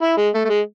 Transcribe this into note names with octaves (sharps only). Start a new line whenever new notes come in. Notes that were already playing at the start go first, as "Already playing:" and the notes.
E4
G#3
A3
A3
G#3